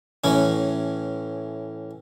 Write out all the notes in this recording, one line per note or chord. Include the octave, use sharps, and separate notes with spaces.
A2 E3 C#4